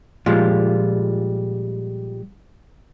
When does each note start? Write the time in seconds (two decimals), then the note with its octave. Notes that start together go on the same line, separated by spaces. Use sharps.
0.26 A#2 F3 G3 G#3 F4